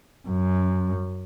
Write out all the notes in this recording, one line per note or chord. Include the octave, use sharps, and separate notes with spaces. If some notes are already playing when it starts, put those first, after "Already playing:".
F#2